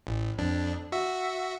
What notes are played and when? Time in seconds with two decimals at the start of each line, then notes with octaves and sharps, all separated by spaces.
0.07 A1
0.38 F2 D4
0.92 F#4 E5